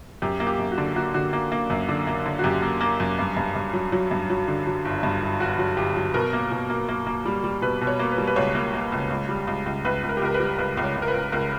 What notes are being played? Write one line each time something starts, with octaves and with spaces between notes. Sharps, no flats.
F#2 G4
A#3
G4
F#2
F#4
D3
A#3 F#4
D3 F#4
A#3
A#3
F#2
D3
A#3
D3
F#4
F#2 G4
A#3
A#3
F#2
G2
G2
G2
F#3
F#3
G2
F#3
D3
F#3
G1
G2
G1
G1 F#4
F#3
G1 G4
F#3
B2 A#4
A#3
B2
A#3
A#3
A#3
G3
G3
B2 B4
B2
C#5
A#3
B4
G3
B4
C#2 C#5
A#3
A#3
C#2
C#2
G3
C#2
C#2
C#2 B4
C#2
A#4
G4
C#2 A#4
B4
G3
C#2 B4
C#2
C#5
C#2
A#4
B4
C#2
C#2 A#4